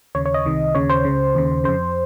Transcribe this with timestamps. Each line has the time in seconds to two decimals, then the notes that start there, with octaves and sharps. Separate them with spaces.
0.15 D#2 C#3 C#5
0.26 C#5
0.34 D#5
0.45 C2 C3 D#3
0.75 D#2 C#3 C#5
0.89 C5
1.05 C#2 C#3
1.35 D#2 C#3
1.64 F2 C#3 C5